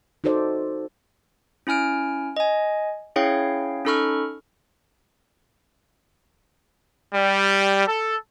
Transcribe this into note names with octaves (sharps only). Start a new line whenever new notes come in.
D#4 F#4 A4 C5 D5
C#4 E4 G#5 F6 D7
D#5 G#5
C#4 E4 G#4 C#5 F5 G5
C#4 D#4 A4 B5 C#6 F6
G3
A4